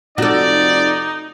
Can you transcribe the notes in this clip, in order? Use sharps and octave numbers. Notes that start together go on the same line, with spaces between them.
F1 D#4 F#4 A4 D5